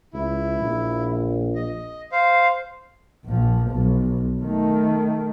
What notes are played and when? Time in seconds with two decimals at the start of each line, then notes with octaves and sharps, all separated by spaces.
0.14 C#2 E4
0.60 A#1
1.55 D#5
2.12 C5 F5
3.25 A#1 F3
3.70 B1
4.43 D#3 A3